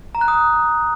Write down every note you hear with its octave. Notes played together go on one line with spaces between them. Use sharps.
A#5
F#6
D#6